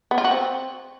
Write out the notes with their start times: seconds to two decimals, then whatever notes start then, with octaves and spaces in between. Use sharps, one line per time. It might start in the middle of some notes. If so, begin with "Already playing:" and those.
0.11 B3
0.18 F4
0.24 F#4
0.31 C4